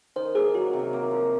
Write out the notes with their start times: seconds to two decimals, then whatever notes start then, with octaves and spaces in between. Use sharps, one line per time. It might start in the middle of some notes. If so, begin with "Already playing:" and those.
0.16 D#3 C5
0.35 A#3 G#4
0.54 F#3 F#4
0.73 C3
0.93 A#3
1.11 F3